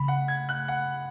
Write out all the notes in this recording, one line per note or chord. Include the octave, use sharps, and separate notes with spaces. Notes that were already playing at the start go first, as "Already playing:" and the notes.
Already playing: C#3 B5
F#5
G#6
F#6
F#5